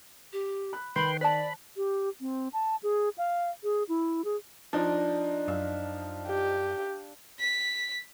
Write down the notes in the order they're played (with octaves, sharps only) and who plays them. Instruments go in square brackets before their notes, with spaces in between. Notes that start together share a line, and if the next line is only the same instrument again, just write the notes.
[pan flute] G4
[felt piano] B5 F#6
[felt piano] D#3 [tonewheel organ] B4 G5 C6 [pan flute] B5
[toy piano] C5 A5 [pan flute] D5 [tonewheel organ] B5
[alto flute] G4
C4
A5
G#4
F5
G#4
E4
G#4
[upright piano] F3 D#4 [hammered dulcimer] D4
[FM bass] F#2 [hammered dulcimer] E5 F5
[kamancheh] G4
[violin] B6